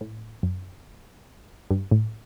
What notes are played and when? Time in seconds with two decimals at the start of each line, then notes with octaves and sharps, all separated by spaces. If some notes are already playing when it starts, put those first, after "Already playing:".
0.01 A2
0.43 F#2
1.71 G2
1.91 A2